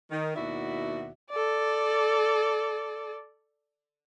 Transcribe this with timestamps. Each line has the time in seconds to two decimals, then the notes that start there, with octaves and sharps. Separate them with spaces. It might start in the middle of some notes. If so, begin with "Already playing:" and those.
0.11 D#3
0.36 D#2 B2 E4 F#4 D5 E5
1.31 A4 D5